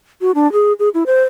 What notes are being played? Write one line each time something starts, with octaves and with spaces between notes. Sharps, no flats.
F#4
D4
G#4
G#4
E4
C5